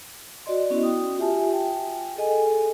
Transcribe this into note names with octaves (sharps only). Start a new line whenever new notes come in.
F#4 D5 D#5 C6
B3 C#4 E4 F#4
F#4 G5 D#6
F4 G4 E5 G#5 A5
G5 G#5
G#4 A4 D#5 G#5